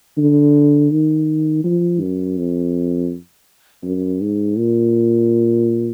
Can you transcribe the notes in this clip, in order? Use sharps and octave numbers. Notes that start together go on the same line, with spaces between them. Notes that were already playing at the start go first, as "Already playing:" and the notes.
D3
D#3
F3
F#2
F2
F#2
G#2
A#2